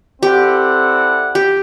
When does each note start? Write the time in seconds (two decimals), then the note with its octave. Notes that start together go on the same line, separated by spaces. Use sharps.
0.22 C4 E4 G4 A4 D5 F#5
1.35 G4